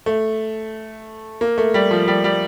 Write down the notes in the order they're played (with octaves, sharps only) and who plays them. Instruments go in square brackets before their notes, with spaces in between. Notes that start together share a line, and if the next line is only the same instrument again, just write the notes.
[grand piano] A3
A#3
A3
G3
F3
G3
G3